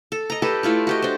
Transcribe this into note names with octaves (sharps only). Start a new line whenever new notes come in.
A4
D#5 A#5
G4 A4 B4
A3 E4 F4 C#5
F#4 G4 D#5
D4 C5